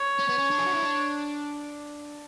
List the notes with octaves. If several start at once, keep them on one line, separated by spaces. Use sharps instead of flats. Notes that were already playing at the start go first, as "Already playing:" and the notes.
Already playing: C#5
C#4
B3
C#4
D4
G#4
F#4
E4
D4